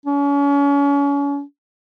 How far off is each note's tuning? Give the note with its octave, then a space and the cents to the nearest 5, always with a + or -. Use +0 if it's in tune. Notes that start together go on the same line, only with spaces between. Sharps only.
C#4 +35